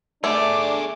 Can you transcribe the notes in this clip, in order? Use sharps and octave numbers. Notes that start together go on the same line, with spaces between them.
A3 D4 G#4 D5 D6